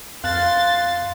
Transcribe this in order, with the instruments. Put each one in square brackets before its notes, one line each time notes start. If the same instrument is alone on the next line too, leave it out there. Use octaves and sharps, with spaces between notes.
[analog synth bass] F2 [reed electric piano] F5 F#6 [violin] C6 A6